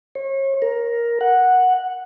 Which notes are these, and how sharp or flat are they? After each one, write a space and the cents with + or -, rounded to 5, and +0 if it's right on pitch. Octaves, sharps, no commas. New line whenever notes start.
C#5 -35
A#4 +10
F#5 -5